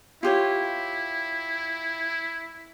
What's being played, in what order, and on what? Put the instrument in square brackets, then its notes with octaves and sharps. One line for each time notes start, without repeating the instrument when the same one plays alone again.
[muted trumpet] E4 [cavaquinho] F4 G4 C#5